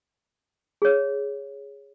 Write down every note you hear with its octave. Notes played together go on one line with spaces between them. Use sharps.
G#4 C#5